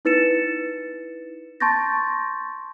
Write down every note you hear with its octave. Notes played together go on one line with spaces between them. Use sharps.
D#4 E4 B4 A6 C#7 E7
A5 C6 C#6 G6 A6 A#6